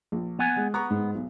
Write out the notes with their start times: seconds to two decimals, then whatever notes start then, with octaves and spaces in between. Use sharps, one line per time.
0.12 A#1
0.39 B3 F#5 G#5
0.56 G#3
0.74 B3 A#5 C#6
0.90 G#2
1.15 B1